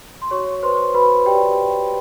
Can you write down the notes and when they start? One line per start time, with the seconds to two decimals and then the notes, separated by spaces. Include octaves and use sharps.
0.22 C6
0.31 F#4 C#5 C#6
0.63 B4 C5 C6
0.94 F#4 B4 B5
1.26 G4 D5 G5